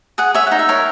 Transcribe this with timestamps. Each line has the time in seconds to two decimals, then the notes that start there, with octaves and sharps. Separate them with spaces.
0.18 G#4 F#5
0.34 C#5 E5
0.47 D#4 F#5
0.59 E5
0.69 A#4 C#5